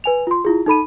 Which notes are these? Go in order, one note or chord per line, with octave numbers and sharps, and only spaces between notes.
B4 G#5 F7
F4 C6
E4 F4 G#4
D#4 A4 B5 D#7